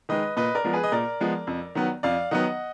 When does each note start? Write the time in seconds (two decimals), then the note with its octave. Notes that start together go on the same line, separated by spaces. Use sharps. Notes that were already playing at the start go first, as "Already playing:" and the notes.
0.09 D#3 G#3 B4 D#5
0.37 A#2 B4 D#5
0.55 A#4 D5
0.65 F3 G#3 B3
0.73 G#4 B4
0.83 D#5
0.92 A#2 A#4 D5
1.20 F3 G#3 B3
1.47 F2
1.75 D#3 F#3 B3
2.03 F2 D5 F5
2.31 D#3 F#3 B3 D#5 F#5